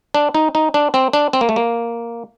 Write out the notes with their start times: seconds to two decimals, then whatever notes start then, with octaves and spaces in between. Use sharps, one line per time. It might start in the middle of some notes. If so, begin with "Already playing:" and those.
0.14 D4
0.35 D#4
0.55 D#4
0.74 D4
0.94 C4
1.13 D4
1.33 C4
1.41 A#3
1.49 A3
1.56 A#3